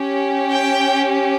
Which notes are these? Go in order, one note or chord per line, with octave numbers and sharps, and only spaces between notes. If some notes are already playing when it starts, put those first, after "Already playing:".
Already playing: C#4 G4
G5